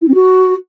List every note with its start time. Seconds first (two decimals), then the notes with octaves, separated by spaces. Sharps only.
0.01 E4
0.08 C4
0.14 F#4